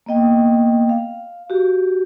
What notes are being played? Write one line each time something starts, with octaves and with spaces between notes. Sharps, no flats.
A#3 B3 D#5 G5
F5
F#4 G4